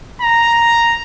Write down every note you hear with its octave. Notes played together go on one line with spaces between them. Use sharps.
A#5